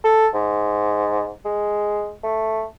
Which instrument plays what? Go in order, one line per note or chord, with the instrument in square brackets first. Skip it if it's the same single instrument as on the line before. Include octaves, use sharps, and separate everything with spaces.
[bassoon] A4
G#2
G#3
A3